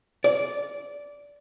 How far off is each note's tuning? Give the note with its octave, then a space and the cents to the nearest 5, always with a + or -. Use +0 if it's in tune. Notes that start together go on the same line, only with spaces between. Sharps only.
D5 -15